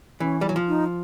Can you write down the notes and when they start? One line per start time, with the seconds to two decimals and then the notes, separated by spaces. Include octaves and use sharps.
0.20 E3 C#4
0.41 G3
0.49 F#3
0.56 F3
0.68 D#4